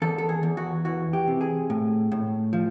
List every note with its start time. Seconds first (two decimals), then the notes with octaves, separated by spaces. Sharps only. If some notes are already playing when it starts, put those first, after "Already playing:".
0.02 E2 A4
0.18 A4
0.29 G#4
0.43 E2
0.57 F#4
0.85 E3 F#4
1.13 G4
1.28 C3
1.41 G#4
1.70 A2
2.12 A2
2.53 F3